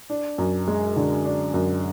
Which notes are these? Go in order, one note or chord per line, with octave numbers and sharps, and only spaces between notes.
D4
F#2
G#3
D3
D4
F#2